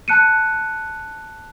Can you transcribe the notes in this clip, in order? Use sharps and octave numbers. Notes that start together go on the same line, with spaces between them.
A5 F#6 C#7 D#7